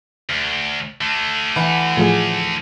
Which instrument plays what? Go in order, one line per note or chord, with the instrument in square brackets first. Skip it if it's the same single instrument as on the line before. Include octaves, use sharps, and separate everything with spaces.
[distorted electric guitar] D2
D3 A3
[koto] E3 F#5
[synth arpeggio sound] A2 F3 G#4